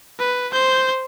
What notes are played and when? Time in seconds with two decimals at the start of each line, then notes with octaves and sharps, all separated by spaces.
0.19 B4
0.53 C5 G6